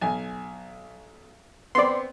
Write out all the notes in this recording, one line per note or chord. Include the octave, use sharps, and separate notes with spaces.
B1 G#5
B3 C4 D5 C6